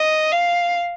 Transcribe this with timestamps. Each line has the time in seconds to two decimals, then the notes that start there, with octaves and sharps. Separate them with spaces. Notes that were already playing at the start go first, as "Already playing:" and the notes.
Already playing: D#5
0.32 F5